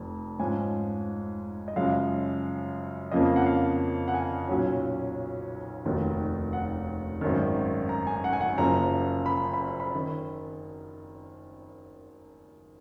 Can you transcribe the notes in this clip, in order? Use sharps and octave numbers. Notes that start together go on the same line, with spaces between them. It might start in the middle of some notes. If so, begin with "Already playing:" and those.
Already playing: F1 F2
G#2 F3 G#3 C#4 G#5
D#5
F#2 C#3 F3 G#3 F5
F2 C#3 F3 A#3 C#4 D#5
F#5
F5
F#5
G#5
B1 A#2 F#3 C#4
F1 D#2 D#3 F#3
F#5
G#1 F#2 D#3
A#5
G#5
F#5
G#5
F#5
F#1 F#2 F3 A#3 A#5
B5
B5
B5
D#3